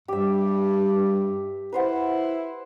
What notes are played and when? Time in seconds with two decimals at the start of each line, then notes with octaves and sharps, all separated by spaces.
0.08 G2 G4 E5
1.72 E4 B4 C5 F#5